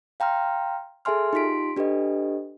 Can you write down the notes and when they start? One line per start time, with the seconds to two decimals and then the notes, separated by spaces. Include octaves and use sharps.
0.20 F5 G5 A#5 C6 F6
1.05 G#4 A4 E5 G#5 C6 F6
1.33 D#4 F4 G4 C6 B6 D7
1.77 D4 G4 A4 B4 D#5